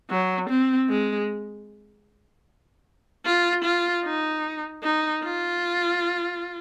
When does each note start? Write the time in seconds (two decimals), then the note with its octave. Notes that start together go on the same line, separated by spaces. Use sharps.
0.11 F#3
0.49 C4
0.89 G#3
3.25 F4
3.64 F4
4.05 D#4
4.83 D#4
5.23 F4